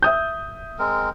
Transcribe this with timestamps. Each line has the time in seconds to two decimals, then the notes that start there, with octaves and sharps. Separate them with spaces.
0.02 E5 D#6 G6
0.79 G#3 C4 A#4